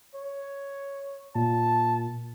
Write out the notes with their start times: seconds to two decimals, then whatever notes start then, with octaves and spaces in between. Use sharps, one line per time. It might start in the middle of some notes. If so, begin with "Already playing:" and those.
0.15 C#5
1.35 A#2 A5